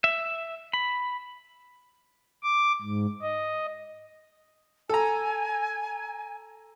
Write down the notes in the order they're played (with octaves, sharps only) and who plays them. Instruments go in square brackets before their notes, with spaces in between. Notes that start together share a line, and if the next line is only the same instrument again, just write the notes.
[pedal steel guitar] E5
B5
[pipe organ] D6
G#2
D#5
[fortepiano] A4 A#5 [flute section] G#5